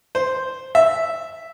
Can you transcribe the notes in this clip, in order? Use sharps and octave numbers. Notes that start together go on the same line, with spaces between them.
C5
E5